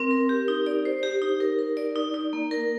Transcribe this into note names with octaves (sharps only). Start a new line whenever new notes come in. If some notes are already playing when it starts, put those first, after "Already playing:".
Already playing: C4 A#4
A#4
G4
D#4
D5
C5
G4
D#4
A#4
A#4
D5
D#4
D#4
A#3
A#4